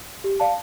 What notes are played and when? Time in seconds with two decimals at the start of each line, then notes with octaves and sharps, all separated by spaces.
0.24 G4
0.40 D5 F5 A5